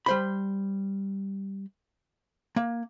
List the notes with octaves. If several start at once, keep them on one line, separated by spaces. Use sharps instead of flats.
G3 C5 B5
A#3